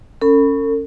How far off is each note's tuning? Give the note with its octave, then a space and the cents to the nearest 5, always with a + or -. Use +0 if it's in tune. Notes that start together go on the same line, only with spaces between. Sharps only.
C#4 +0 A4 +45 B5 +0